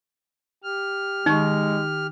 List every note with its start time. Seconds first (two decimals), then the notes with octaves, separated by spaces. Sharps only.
0.63 G4 F6
1.26 D#3 G#3 D#4 C#6